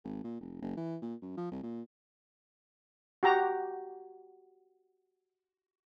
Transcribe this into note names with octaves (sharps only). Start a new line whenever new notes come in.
G#1
A#2
F1
F#1
E3
A#2
F#2
F3
C2
A#2
F#4 G4 A#5